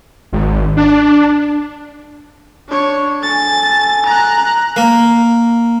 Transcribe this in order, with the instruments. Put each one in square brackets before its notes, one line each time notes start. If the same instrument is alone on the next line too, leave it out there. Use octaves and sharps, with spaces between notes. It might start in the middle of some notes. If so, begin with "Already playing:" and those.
[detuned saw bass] G#1
D4
[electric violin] D4 C#5
[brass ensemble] A4 G#5 [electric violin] A6
[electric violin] A#5 F#6
[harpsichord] A#3